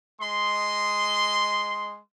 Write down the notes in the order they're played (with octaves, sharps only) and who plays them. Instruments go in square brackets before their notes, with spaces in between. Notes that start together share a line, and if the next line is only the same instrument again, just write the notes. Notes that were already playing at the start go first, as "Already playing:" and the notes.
[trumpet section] G#3 D#5 C6